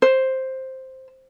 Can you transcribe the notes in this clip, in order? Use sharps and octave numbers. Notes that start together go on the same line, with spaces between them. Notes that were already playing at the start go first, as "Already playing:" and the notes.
C5